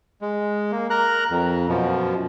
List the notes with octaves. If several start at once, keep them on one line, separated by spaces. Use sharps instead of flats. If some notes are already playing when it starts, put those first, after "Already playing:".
G#3
A#3
A#4 A#5 F#6
F2
F#2 B2 F3